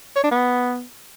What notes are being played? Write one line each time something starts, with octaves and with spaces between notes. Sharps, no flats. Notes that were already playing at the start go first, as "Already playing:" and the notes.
C#5
D4
B3